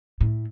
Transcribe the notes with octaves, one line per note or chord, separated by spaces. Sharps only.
A2